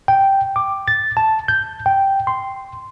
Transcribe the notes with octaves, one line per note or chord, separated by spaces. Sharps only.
G5
D6
A6
A5
G6
G5
C6